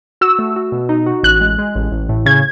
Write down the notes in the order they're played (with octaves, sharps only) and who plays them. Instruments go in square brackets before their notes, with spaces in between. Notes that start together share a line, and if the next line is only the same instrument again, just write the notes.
[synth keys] F#4 [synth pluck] E6
[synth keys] A3
F#4
B2
D#4
F#4
[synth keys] A1 [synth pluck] F#6
[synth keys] G#3
G#3
A1
A1
A2
[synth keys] C#3 [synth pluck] G#6